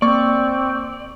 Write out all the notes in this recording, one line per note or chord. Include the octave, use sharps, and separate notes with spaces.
A#3 C4 D5 C#6